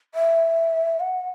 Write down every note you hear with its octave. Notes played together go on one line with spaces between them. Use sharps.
E5
F#5